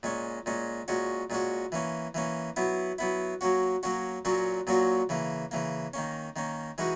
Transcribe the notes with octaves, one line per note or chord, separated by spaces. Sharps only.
A#2 G#3 C#4
A#2 G#3 C#4
A#2 G#3 C#4 F#4
A#2 G#3 C#4 F#4
E3 A#3 C#4
E3 A#3 C#4
F#3 B3 E4
F#3 B3 E4
F#3 A#3 C#4 F#4
F#3 A#3 C#4 F#4
A#2 F#3 A#3 C#4 F#4
A#2 F#3 A#3 C#4 F#4
C#3 E3 A#3
C#3 E3 A#3
D#3 A#3 C#4
D#3 A#3 C#4
E3 G#3 D#4 F#4